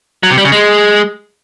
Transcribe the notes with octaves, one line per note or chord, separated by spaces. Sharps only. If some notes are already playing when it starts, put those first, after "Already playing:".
F#3
C3
G3
C#3
G#3